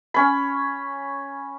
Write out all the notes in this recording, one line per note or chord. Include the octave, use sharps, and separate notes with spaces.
C#4 B5